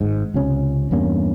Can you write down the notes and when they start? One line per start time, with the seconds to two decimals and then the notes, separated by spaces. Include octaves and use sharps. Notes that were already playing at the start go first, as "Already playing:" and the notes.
0.01 G#1 G#2
0.34 C#2 C3 C#4
0.91 E2 G2 A#3 C#4